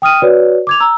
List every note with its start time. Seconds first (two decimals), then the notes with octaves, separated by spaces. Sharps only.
0.02 G5 D#6 F6 D#7
0.22 F#4 B4 C#5 D5
0.67 D6 G#6 F7
0.80 A#5 E6